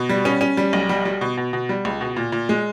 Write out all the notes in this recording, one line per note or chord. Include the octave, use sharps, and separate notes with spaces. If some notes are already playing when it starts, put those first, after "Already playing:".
Already playing: B2
G3
C#4
C#4
G3
B1
G3
G3
B2
B2
B2
G3
C#2
B2
A#2
A#2
G#3